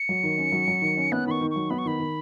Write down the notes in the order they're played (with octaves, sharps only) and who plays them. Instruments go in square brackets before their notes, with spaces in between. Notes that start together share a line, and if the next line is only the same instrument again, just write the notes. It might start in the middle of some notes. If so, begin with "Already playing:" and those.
Already playing: [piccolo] C#7
[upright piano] F#3
D#3
C#4
F#3
F#3
D#3
C#4
[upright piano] B3 [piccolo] F#6
[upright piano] D#3 [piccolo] B5
[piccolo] C#6
[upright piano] D#3
[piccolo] C#6
[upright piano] F#3
[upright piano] B3 [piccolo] B5
[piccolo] C#6
[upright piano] D#3 [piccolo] B5
[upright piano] D#3